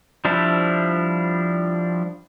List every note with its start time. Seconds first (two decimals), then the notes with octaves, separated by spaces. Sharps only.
0.25 F3 G3 D4 E4